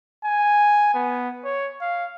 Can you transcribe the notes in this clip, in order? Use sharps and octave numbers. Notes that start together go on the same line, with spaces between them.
G#5
B3
C#5
F5